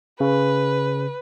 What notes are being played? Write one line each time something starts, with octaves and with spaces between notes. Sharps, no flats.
C#3 B4